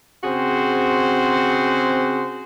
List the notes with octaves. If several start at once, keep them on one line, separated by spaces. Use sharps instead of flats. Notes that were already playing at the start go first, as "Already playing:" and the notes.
C#3 C4 F#4 G#4 C5